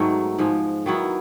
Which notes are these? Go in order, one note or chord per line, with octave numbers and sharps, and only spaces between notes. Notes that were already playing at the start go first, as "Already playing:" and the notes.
Already playing: G#2 D#3 F#3 A3 B3
G#2 F3 G#3
D#3 F#3 B3 E4